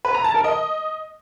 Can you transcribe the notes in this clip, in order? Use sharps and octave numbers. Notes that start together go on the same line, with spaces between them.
B4
A#5
A5
A#4
D#5